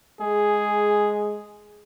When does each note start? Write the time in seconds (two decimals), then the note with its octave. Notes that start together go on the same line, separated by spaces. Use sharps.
0.21 G#3 G#4